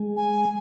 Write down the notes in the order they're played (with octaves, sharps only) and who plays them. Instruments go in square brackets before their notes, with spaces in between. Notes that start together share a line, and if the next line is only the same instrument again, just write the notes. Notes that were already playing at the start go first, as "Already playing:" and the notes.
Already playing: [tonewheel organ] G#3
[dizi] G#5